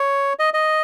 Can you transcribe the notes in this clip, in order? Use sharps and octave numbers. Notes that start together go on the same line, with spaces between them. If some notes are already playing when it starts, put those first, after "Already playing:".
Already playing: C#5
D#5
D#5